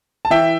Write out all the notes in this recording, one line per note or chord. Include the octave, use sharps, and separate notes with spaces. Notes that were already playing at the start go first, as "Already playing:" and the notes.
A5
E3 E5 G5